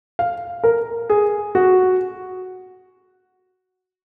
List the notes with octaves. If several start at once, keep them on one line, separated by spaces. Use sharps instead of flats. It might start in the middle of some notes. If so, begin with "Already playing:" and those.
F5
A#4
G#4
F#4